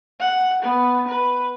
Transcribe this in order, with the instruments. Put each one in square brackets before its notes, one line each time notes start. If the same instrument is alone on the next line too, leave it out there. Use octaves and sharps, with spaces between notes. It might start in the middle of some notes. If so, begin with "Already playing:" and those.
[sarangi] F#5
B3
B4